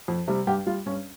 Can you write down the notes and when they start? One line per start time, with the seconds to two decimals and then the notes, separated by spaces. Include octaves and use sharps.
0.08 F2
0.28 C3 G3
0.47 G2 G4
0.67 G3 F4
0.86 G2 C#4